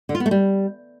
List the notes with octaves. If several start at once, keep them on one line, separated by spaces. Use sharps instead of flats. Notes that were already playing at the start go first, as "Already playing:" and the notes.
D3
F4
B3
A3
G3